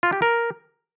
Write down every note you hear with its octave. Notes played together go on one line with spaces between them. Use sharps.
F4
G4
A#4